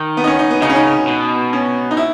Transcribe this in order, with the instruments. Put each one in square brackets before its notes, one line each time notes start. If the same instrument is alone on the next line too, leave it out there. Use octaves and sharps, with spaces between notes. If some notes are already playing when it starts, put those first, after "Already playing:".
Already playing: [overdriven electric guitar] D#3
[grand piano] B3
D#4
C#4
D#4
B3
[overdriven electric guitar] C#3 [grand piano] D#4
[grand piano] C#4
D#4
[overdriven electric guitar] B2
[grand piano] C#4
D#4
E4